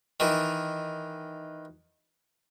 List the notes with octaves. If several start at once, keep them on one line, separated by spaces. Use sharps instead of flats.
D#3 E3